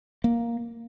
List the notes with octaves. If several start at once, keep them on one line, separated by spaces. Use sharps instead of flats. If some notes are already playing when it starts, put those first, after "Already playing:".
A#3